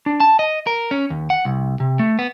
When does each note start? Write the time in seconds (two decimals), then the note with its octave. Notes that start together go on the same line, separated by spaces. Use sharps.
0.06 D4
0.20 A5
0.39 D#5
0.67 A#4
0.91 C#4
1.10 D#2
1.30 F#5
1.45 C2
1.80 C3
1.99 A3
2.19 B3